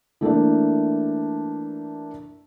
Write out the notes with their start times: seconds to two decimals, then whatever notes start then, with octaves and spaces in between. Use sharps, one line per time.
0.21 E3 A3 A#3 D4